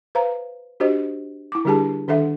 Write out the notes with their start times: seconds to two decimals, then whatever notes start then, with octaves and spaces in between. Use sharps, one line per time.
0.15 B4 C5 F5 A#5
0.80 D4 F#4 G4 C5 D#5
1.52 E4 D6
1.65 D3 G3 D4 G4 G#4 A5
2.08 D#3 D4 A4 E5 F#5